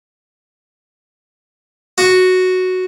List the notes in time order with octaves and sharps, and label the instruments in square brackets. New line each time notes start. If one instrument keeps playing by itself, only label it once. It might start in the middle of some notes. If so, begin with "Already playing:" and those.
[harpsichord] F#4